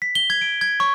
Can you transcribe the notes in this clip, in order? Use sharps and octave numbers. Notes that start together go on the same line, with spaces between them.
B6
G7
G#6
D7
G#6
C#6